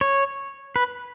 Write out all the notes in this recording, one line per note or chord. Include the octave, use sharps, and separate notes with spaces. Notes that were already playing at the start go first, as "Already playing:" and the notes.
C#5
B4